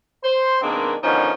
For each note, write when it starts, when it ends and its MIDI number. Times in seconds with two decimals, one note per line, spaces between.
0.24 0.58 72
0.62 0.95 47
0.62 0.95 51
0.62 0.95 56
0.62 0.95 58
0.62 0.95 60
0.62 0.95 62
1.03 1.32 47
1.03 1.32 50
1.03 1.32 51
1.03 1.32 53
1.03 1.32 61
1.03 1.32 63